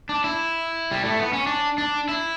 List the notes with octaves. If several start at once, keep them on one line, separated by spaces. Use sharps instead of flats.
D4
E4
G3
A3
B3
C#4
D4
D4
E4